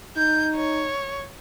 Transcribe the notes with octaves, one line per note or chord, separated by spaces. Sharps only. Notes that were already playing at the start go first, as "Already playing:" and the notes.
D#4 G6
C#5